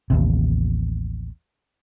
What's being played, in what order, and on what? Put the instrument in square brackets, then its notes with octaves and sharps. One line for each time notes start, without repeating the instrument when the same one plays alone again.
[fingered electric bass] A1 D#2 C3